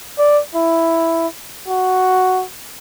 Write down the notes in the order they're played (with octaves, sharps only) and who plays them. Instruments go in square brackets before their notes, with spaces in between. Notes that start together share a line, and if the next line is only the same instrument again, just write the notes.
[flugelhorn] D5
E4
F#4